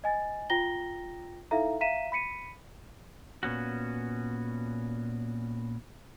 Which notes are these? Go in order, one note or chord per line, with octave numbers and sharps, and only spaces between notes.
D#5 G#5 A6
F4 G5 A#5 A#6 G7
D#4 E4 A4 E5 F5 A#5
E5 F5 A#5 B6 D#7 E7
B5 B6 C#7 D#7
A#2 B3 C#4 F#4